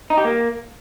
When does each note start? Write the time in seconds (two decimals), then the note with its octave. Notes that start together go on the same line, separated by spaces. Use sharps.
0.10 D#4
0.17 G4
0.25 A#3